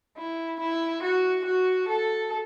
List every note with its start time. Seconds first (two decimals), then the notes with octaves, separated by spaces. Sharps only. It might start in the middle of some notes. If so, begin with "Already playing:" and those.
0.18 E4
0.60 E4
1.03 F#4
1.45 F#4
1.88 A4